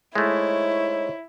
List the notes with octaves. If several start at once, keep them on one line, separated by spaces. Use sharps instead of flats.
G#3 A3 D#4 E4 C5 C#5